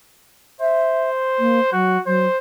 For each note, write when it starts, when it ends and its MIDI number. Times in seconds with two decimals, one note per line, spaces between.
0.61 1.71 72
0.61 1.10 76
1.39 1.60 58
1.72 1.98 54
1.72 2.00 66
2.06 2.27 54
2.06 2.38 72